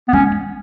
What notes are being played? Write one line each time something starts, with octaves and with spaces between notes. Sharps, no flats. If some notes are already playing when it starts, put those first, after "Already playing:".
B3
G#3 C#4